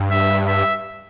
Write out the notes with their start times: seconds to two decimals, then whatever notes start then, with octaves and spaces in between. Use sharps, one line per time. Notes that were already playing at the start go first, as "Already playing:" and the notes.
Already playing: G2
0.11 E5
0.48 E5